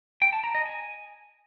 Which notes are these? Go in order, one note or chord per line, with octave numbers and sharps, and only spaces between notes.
G5
A5
A#5
D#5
G#5